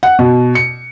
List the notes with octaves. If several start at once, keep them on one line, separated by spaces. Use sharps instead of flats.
F#5
B2
C#7